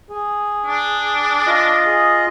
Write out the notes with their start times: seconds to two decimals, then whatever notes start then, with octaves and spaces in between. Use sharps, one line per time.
0.10 G#4
0.67 D4
1.47 F4 D#5
1.86 G#4